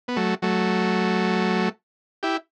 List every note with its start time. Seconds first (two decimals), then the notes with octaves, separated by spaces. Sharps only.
0.08 B3
0.16 F#3 A3
0.42 F#3 A3
2.23 E4 G4